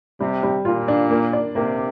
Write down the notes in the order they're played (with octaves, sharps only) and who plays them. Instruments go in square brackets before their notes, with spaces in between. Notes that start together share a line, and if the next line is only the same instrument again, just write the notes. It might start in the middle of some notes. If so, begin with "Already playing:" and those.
[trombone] C3 [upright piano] G3
[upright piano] G3
[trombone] A#2 [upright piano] F4
[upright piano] D4
A#3
D5
[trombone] C3 [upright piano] A#3